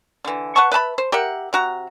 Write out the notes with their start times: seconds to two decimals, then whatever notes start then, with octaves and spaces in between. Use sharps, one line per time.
0.25 D3 E3
0.56 B4 F#5 A5 C#6
0.72 B4 E5 A5 B5
0.98 C5
1.12 G4 A#4 E5 F#5
1.53 C3 F#4 A#5